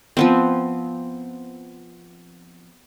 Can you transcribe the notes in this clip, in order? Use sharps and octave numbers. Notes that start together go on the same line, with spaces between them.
F3 B3 C4